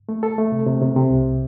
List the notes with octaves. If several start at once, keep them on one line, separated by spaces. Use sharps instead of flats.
A3
A4
A3
C3
C3
C3
C3
C2